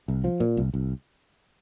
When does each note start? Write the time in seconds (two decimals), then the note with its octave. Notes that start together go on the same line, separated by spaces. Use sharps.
0.08 C2
0.24 F3
0.40 A#2
0.57 C2
0.74 C2